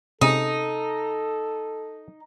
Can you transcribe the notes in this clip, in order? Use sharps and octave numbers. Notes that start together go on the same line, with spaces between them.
C3 G#3 C#4 D#4 A4